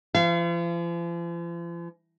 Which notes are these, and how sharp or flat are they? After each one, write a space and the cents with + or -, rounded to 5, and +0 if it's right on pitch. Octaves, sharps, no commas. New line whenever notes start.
F3 -45 F5 -35